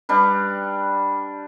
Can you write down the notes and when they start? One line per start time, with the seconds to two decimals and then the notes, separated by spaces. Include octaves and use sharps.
0.09 G3 D4 B4